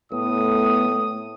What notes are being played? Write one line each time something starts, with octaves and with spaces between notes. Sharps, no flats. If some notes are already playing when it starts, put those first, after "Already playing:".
A2 A3 B3 D#6